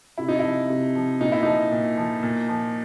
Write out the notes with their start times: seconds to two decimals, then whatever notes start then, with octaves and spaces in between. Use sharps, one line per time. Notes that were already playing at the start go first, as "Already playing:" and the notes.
0.18 C3 E4
0.28 D#4
0.39 F3 E4
0.70 C3
0.95 F3
1.21 A#2 D#4
1.32 E4
1.43 F3 D#4
1.72 A#2
1.97 F3
2.23 A#2
2.49 F3